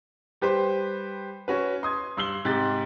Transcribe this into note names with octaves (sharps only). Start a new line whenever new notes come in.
G3 G4 B4 C5
C#4 F#4 B4
C6 D#6 G#6
G2 C6 E6 C7 F#7 G7
G#2 C3 G4 A6